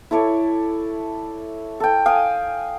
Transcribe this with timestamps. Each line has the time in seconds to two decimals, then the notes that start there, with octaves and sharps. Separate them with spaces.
0.11 E4 A4 C#5 D5
1.80 A4 G5
2.06 F5 G5 G#5 D#6